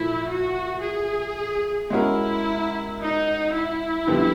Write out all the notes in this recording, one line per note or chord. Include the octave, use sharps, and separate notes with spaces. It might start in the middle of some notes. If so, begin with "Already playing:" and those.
Already playing: A#2 F3 A3 E4
F#4
G#4
G#3 C#4 E4 F#4 A#4
D#4
E4
F2 D3 G3 B3